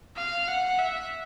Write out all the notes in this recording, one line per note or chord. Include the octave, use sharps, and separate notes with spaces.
F5
F#5
E5